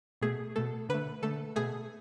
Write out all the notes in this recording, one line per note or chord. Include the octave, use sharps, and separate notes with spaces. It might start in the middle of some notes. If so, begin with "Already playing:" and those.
B2 A3 G#4
B2 A3 A4
D3 A3 B4
D3 A3 A4
B2 A3 G#4